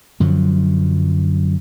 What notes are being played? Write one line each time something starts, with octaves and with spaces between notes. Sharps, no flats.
F#2 D3 F3 F#3